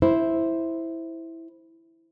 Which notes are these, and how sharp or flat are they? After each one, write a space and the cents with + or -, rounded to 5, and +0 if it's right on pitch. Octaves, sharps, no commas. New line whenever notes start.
E4 -5 C5 +0